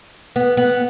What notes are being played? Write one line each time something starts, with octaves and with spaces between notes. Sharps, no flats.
B3
B3